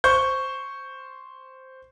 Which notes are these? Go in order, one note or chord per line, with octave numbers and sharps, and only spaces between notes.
C5 C#6 G6